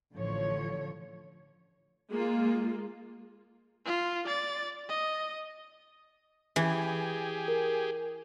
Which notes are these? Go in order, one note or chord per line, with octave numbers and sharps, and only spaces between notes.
A1 D3 F3 C#5
G#3 A#3 F4
F4
D5 A6
D#5
E3 G4 G#4
A#4